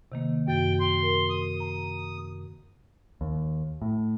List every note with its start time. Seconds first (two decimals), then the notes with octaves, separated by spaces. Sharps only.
0.12 C3 D#3 A#3
0.48 F#2 G5 A6
0.80 C6
1.03 A#4
1.30 D#6
1.60 A#5
3.21 D#2
3.82 A2